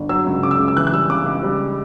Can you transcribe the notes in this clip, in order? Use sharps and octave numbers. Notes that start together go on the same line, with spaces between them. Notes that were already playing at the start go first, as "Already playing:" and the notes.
Already playing: G1
F#3 E6
C#2
C#3 D6
E6
C#2
E6
E3 F#6
F#6
G3 E6
C#3 D6
C#2
G3